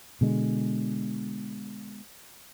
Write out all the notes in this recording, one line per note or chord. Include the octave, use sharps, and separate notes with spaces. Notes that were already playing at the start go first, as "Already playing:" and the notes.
B2 D3 G#3